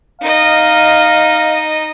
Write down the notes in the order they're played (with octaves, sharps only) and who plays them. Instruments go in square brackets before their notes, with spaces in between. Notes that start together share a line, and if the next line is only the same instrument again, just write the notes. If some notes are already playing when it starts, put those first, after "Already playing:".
[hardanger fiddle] D#4 D#5 [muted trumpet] F5